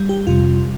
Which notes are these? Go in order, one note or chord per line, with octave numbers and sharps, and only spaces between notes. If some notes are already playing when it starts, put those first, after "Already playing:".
Already playing: G3
G4
F2 C3 G3 F4